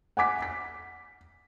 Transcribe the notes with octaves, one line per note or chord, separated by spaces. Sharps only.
F#5 G#5 D6 B6
B6